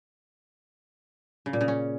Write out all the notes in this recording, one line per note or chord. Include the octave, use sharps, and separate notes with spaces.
C#3
A#2
C#3
C#4